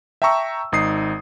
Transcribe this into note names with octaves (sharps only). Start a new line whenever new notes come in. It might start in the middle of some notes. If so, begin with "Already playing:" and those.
E5 G5 A5 A#5 C#6 E6
G#1 D#4 D#6 C7